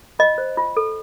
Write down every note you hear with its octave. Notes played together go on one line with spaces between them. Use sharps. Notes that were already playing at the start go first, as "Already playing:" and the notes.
F4 D#5
C5
F4
A4